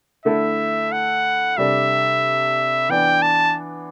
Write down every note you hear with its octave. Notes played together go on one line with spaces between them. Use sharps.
D3 A3 E4 A4 E5
F#5
C3 G3 D4 A4 E5
E3 B3 D4 G5
A5